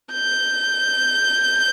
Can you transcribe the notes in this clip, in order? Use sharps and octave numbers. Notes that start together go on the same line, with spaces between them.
G6